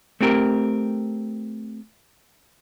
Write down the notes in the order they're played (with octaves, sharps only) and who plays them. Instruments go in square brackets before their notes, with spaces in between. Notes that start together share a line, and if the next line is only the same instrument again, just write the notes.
[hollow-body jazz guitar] A3 C4 G4 A#4